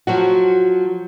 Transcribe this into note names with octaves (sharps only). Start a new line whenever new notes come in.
F3 F#3 F#4